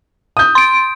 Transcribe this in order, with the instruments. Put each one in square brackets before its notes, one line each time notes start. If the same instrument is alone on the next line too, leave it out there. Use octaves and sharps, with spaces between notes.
[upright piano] D#6 G6
[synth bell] C6 D7